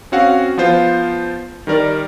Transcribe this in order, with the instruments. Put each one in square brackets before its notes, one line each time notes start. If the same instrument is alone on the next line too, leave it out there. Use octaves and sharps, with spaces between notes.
[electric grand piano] C4 C#4 F#4 F5 F#5
F3 B3 F4 C5
D#3 G3 A#4 D5